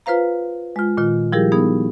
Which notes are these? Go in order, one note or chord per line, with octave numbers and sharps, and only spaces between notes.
F4 B4 C5 F5 A#5
G#3 F4
A#2 D#3 F4
F3 G3 E4 G4 G#4 A#4
B3 D#4 G#4